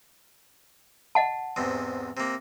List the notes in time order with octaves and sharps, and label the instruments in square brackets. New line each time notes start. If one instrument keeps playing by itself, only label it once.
[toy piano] D#5 F#5 A5
[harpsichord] E2 G#2 C3
C3 A#3